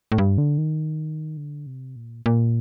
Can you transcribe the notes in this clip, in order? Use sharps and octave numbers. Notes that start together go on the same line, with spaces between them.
A2
G2
D3
D#3
D3
C3
A#2
A#2